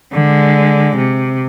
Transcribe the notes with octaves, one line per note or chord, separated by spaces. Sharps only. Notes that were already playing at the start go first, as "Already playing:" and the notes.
D3 G#3
C3